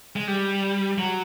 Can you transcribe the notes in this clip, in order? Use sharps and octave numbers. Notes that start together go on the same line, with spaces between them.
G#3
G3
F#3